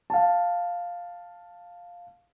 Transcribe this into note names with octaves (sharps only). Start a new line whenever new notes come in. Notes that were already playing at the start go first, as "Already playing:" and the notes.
F5 A5